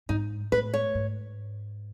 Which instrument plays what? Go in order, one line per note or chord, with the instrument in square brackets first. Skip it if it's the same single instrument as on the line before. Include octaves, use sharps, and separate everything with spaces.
[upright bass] G#2 [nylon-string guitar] D#4
[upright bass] A2 [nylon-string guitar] B4
[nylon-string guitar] C#5
[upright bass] G#2